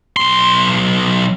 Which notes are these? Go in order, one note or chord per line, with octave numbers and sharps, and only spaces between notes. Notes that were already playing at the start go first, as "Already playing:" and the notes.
B1 C6